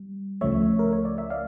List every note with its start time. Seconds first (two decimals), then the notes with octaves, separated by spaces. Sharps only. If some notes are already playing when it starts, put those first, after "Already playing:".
Already playing: G3
0.41 C#2 C#3 F3 A3 C#5 E5
0.79 A#4
0.92 C#5
1.05 D5
1.18 E5
1.30 D5 F5